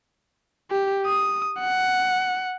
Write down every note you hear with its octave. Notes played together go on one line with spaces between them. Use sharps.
G4
D#6
F#5